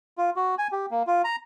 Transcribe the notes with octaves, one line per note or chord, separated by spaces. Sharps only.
F4
F#4
G#5
G4
A#3
F4
A#5